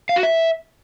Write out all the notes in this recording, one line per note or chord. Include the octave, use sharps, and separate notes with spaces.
F5
F#4
E5